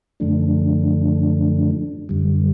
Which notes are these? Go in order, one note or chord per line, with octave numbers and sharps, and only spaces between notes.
F#2 D3 F3 A3 D4
F#2 D3 G3